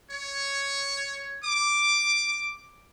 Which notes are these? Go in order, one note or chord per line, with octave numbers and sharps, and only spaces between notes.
C#5
D6